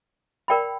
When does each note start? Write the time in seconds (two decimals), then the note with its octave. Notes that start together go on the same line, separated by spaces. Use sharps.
0.48 A#4 D5 G5 B5